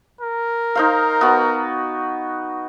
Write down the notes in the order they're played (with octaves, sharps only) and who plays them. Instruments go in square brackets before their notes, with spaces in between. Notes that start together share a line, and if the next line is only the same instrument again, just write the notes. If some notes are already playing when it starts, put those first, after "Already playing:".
[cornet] A#4
[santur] D#4 C5 F5
B3 F#4